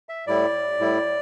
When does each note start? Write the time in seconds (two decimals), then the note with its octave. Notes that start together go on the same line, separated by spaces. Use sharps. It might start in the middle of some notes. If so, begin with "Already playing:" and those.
0.09 E5
0.27 A2 G3 E4 D5
0.79 A2 G3 E4